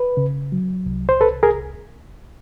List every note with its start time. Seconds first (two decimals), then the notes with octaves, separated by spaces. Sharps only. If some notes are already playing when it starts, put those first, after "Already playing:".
Already playing: B4
0.17 C#3
0.52 F#3
0.86 C2
1.09 C5
1.20 C2 A4 B4
1.43 G#4 A#4